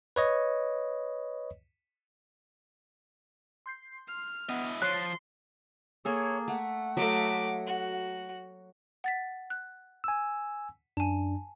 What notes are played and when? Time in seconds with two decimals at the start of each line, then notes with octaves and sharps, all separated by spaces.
0.16 B4 C#5 D#5
3.66 C6 G6 C7
4.08 F6
4.49 B3 E4 D#5 F#5
4.82 F3 C#5 C6 F#6
6.05 A#3 G#4 A4 C#5
6.48 A3 F#5
6.97 F#3 A3 D#5 E5 D6
7.66 F#4
9.04 F#5 A6 B6
9.50 F#6
10.04 G#5 E6
10.97 F#2 D4 G#5 A5